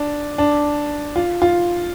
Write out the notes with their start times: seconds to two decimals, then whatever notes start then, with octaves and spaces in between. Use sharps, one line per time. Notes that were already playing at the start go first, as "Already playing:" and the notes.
Already playing: D4
0.38 D4
1.16 F4
1.42 F4